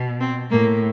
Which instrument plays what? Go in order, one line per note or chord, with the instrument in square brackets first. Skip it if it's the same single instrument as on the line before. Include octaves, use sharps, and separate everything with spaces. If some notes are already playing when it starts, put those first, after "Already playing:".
Already playing: [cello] B2
[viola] C4
[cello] A2 [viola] A#3